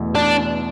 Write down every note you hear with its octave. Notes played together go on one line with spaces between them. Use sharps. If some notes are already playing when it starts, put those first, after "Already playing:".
Already playing: E2 B2 A3
D4